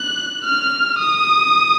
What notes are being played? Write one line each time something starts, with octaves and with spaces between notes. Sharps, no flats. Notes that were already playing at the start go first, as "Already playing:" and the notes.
Already playing: F#6
F6
D#6